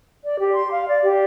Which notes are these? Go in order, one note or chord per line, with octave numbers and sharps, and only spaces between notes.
D5
G4
C6
F5
D5
G4